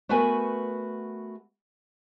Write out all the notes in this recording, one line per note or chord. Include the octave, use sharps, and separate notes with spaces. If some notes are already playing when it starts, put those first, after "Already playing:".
A3 B3 F#4 A#4 B4 G#5